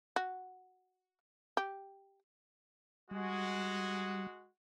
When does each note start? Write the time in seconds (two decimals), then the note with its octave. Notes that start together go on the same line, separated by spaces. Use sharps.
0.16 F#4
1.57 G4
3.11 G3 G#3 F#4